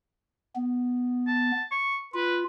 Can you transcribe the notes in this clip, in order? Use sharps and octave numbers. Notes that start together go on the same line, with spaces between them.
B3
A5
C#6
F4 B4